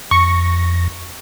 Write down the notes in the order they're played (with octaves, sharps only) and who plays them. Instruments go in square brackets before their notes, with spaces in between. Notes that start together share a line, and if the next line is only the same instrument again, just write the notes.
[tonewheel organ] F2 A#6 [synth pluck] C#6